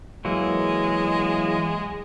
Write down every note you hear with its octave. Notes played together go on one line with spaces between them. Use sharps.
E3 F#3 G#3 A#3